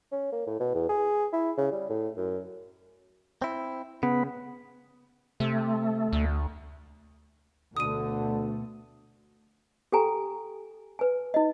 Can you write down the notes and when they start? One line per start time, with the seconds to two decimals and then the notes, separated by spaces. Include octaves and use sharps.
0.12 C#4
0.32 A#3
0.47 A2
0.60 B2
0.74 E2
0.89 G#4
1.33 E4
1.57 C#3
1.72 G3
1.89 A2
2.17 F#2
3.42 C4 E4
4.03 C#3 B3
5.40 C3 A3
6.12 D2
7.77 D2 B2 D3 A3 D#6 D#7
9.92 G4 A4 G5 G#5 A#5
10.99 B4 G#5
11.34 D#4 D#5